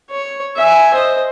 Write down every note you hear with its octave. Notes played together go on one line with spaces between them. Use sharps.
C#5
E5 G#5
C5 D#5